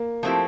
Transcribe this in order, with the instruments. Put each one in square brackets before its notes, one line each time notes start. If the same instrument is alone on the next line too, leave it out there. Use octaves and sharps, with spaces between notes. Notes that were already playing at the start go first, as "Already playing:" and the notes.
Already playing: [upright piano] A#3
[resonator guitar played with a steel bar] F3 A3 C4 E4 G4